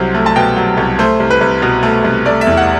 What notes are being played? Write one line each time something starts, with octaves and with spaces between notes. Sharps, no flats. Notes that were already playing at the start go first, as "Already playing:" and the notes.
Already playing: C2 F#3 C5
A3
A5
B2 G5
F#3
C2
A3 C5
C2
B4
C2
B2
A3
C2
A3 D5
E5
E2
F#5